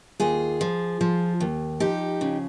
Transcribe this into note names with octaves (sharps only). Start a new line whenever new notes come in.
D#2 F4 G#4
F3
F3
D#2
F3 D#4 G4
C#3